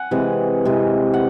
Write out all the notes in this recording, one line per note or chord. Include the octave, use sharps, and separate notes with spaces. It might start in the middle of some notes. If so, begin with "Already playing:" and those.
Already playing: F#5 G#5
C3 E3 G#3
C3 E3 G#3
F#5